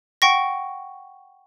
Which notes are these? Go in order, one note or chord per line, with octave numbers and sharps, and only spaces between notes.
F#5 G5 C#6 A#6